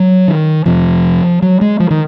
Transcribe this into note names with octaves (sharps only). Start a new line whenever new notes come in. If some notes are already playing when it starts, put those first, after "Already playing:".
Already playing: F#3
D#3
F1 F2 C3 F3
F#3
G#3
F3
D#3